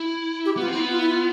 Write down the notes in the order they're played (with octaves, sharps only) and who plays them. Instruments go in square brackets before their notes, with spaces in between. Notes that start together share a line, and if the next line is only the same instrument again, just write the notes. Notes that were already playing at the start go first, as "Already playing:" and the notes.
Already playing: [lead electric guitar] E4
[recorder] G4
[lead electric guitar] B3 [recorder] F4
[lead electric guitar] C4
[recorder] E4
[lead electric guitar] B3
[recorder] F4
E4
F4